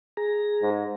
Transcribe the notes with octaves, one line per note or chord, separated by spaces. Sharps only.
G#4 A#5
G#2